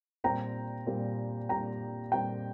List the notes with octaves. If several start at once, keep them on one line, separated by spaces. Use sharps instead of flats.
A#2 G3 C4 G5 A#5
A#2 G3 C4
A#2 G3 C4 G5 A#5
A#2 G3 C4 G5 A#5